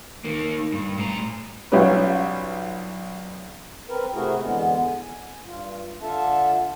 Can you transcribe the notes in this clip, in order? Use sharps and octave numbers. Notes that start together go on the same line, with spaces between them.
D#3 A#3
G2
A2 A#5
B1 G3 C#4 F4 B4
C4 A#4 B4
C3 A3 E4 F#4 G#4 A#4
E2 D3 G#3 B3
G#5
G2 F4
D3 D4 F4 A4 E5 A5